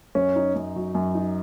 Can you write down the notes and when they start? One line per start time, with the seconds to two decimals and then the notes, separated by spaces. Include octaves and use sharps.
0.15 F#2 C#4
0.36 D#4
0.55 F#2
0.76 F#3
0.95 F#2
1.15 D#4